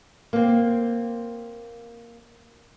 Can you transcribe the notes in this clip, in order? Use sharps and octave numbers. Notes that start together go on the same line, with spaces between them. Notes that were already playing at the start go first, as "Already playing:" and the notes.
A#3 C4